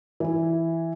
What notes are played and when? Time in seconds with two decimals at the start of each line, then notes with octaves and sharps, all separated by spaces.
0.20 E3 E4